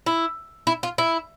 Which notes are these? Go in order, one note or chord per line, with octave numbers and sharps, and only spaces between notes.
E4
E4
F4
E4